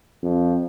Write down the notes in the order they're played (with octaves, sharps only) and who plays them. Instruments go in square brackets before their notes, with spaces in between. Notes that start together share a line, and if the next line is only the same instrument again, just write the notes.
[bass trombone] F2